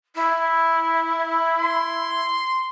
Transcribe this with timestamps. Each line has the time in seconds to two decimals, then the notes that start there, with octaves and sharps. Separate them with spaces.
0.15 E4
1.59 C6